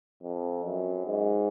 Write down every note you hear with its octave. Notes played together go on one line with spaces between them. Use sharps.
F2
F#2
G#2